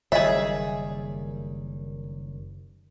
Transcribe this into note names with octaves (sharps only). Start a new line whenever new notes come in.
F#1 D#3 G3 G#4 C#5 D#5 E5